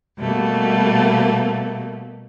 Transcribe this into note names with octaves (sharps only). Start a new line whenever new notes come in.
B2 G3 A3 A#3